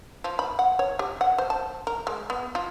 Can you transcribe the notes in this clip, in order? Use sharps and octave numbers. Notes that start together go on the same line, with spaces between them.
F3
B5
F#5
C#5
G4
F#5
C5
A5
A#4
G#3
B3
F4